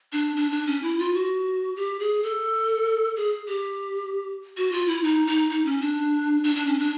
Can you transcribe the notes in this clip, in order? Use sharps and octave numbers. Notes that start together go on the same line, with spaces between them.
D4
D4
D4
C#4
E4
F4
F#4
G4
G#4
A4
G#4
G4
F#4
F4
E4
D#4
D#4
D#4
C#4
D4
D4
D4
C#4
D4